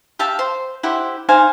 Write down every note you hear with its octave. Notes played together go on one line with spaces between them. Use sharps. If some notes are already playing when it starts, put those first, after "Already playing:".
G4 E5 F5 A5
C5
E4 G4 C5 F#5
D#4 C5 F5 G#5